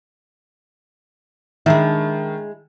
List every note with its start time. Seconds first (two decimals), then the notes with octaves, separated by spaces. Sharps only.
1.66 D#3 G#3 D4 E4